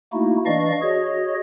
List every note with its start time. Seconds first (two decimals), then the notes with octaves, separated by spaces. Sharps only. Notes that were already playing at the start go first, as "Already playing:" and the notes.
0.13 A3 A#3 D#4 E4 F#4
0.46 E3 D4 D5 D#5 F5 C#6
0.82 F#4 G#4 C#5 D#5